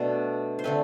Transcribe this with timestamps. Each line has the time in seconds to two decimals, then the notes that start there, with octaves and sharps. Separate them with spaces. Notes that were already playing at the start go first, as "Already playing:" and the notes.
Already playing: B2 A3 D4
0.59 C5
0.64 D3 A3 C4 B4